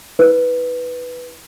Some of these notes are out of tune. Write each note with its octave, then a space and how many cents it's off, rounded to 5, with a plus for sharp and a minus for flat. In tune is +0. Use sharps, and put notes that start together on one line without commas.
E4 -40 B4 +0